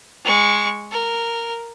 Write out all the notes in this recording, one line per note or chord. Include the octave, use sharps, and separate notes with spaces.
G#3 C#6
A#4